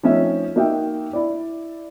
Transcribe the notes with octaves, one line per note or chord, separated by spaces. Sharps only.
F3 A3 C4 C#4 D#4 E5
A#3 D#4 F#4 E5 G5
E4 D5